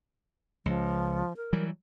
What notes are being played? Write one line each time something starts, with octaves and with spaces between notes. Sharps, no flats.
C#2 F3
A#4
E3 F#3 G3